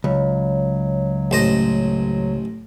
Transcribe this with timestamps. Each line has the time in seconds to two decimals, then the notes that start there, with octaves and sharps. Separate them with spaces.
0.04 C#2 F#3
1.31 A1 C5 D#5